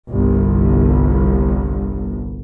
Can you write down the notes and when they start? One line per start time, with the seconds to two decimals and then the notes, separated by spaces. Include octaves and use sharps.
0.11 G1 C2